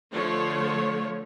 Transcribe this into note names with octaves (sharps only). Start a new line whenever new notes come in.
D3 F3 A3 C#5